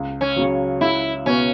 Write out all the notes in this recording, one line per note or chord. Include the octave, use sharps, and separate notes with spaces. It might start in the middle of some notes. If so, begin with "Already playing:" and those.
Already playing: C#2
C#4
C#3 F#3
C#2 E4
B2 B3 C#4